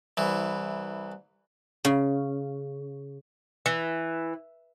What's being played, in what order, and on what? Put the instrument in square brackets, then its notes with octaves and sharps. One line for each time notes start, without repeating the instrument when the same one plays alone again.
[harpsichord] C2 E3
[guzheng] C#3
[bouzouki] E3